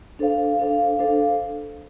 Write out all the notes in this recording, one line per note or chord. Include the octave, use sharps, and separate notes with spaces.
D4 A4 C5 F5
D4 A4 C5 F5
D4 A4 C5 F5